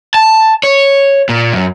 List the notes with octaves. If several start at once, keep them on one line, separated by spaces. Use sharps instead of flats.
A5
C#5
A#2
F#2